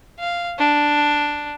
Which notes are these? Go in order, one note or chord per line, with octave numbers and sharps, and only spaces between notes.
F5
D4